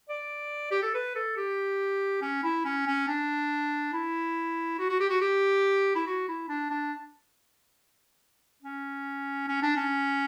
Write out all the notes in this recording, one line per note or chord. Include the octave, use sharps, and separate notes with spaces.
D5
G4
A4
B4
A4
G4
C#4
E4
C#4
C#4
D4
E4
F#4
F#4
G4
F#4
G4
E4
F#4
E4
D4
D4
C#4
C#4
D4
C#4